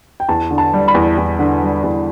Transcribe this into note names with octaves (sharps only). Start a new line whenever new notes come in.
G5
E2 A5
D3
A5
G3
B5
E2
E2
D3
G3
E2